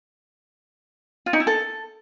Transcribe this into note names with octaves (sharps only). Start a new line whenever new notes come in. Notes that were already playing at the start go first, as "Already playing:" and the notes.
F4
D#4
E4
A4